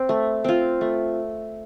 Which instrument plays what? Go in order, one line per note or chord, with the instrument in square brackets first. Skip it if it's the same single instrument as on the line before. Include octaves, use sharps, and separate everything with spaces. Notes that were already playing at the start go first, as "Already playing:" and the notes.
Already playing: [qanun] C4
A3
C4 F4
A3